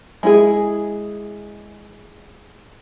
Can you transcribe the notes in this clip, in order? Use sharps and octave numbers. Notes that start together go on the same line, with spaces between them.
G#3 E4 G#4